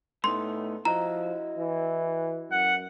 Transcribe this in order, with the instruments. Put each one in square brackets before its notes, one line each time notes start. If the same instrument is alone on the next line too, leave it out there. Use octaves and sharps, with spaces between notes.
[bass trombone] A2 [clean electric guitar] A3 B3 D#4 [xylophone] C6
[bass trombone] F3 [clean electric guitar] E4 F#4 D#5 [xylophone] A#5
[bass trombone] E3
[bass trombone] F#2 [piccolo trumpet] F#5